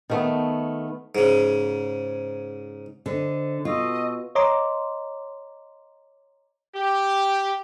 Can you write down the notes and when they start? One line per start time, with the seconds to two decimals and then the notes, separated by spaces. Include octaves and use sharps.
0.10 D#3 A3 B3
1.15 G#2 C#3
3.06 D3 C5 D#5
3.65 B2 F4 D#5 C#6 E6
4.35 C#5 D#5 A#5 C6 D6
6.75 G4